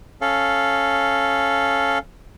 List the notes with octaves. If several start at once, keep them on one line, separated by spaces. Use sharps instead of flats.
C#4 A4 F5